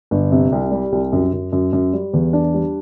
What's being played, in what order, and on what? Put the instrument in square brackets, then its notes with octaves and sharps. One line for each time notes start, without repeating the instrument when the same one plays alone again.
[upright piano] G1
C3
C2
G3
C2
F#2
F#2
F#2
F#2
G3
E2
D4
G3